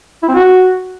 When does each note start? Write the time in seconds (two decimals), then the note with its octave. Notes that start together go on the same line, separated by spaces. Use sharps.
0.23 E4
0.29 C4
0.34 F#4